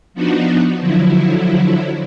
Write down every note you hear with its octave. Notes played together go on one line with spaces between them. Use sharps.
F3 B3 D4 D#4 F#4
D3 F3 F#3 E4